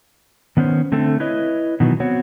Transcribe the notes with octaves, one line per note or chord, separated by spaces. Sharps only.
D#3 B3 C#4 C5
D3 A3 C4 A4
E4 B4 C#5 D#5
B2 D#3 E3 F#3 B3
B3 C4 F#4 C#5